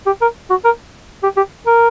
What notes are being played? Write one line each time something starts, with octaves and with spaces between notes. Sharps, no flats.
G4
A#4
F#4
A#4
G4
G4
A#4